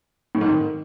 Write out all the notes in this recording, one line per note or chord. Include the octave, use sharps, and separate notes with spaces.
A2
G#2
D#3